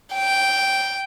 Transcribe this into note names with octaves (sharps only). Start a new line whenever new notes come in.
G5